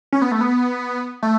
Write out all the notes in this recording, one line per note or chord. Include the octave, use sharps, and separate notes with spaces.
C#4
B3
A3
B3
A3